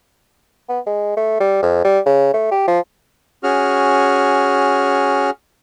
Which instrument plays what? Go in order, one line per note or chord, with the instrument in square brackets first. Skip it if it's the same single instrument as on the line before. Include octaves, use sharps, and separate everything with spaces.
[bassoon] B3
G#3
A3
G3
F2
G3
C#3
A3
G4
F3
[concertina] C#4 F#4 G#4 F6